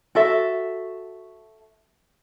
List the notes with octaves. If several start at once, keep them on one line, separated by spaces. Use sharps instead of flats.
F#4 A4 E5